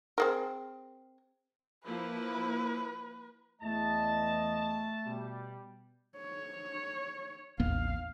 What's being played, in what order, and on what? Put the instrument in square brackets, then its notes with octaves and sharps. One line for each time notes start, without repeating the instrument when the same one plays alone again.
[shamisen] C4 G#4 A#4
[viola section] F3 A#3 E4 [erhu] B4
[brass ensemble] E2 D#5 [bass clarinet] A3 [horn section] A5
[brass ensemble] B2 G3
[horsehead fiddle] C#5
[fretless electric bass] A1 D#2 B3 [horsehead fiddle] F5